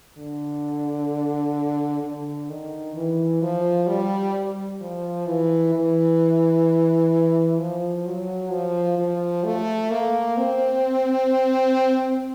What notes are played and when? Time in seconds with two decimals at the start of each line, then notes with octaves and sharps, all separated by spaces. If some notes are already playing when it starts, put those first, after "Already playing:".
0.17 D3
2.03 D3
2.49 D#3
2.96 E3
3.42 F3
3.87 G3
4.81 F3
5.26 E3
5.74 E3
7.58 F3
8.06 F#3
8.51 F3
8.98 F3
9.44 A3
9.91 A#3
10.37 C4